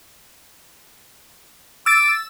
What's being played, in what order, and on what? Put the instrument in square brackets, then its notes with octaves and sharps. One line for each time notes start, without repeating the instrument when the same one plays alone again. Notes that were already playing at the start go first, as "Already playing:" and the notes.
[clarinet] D6 [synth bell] E6 A6